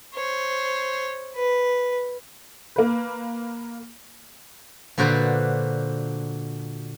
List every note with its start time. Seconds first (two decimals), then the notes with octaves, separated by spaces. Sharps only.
0.14 C5 C#5
1.36 B4
2.76 A#3 B4
4.98 A#2 D3 F#4 B4 C5 D5